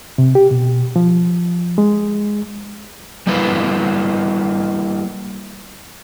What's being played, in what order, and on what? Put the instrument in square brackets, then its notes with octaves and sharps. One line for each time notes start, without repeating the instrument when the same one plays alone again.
[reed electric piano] C3
G4
B2
F3
G#3
[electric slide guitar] G3 A#3 E4 A4 B4